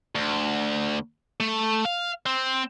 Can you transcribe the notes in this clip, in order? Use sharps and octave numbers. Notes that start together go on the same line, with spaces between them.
D2
A3
F5
C4